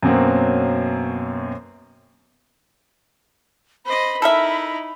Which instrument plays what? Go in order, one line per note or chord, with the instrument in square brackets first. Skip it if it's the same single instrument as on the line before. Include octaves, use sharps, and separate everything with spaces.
[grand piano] F#2 B2 F#3 A#3 C4
[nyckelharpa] C5 D#5 [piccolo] B5
[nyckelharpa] D#4 E4 [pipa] A4 A#4 E5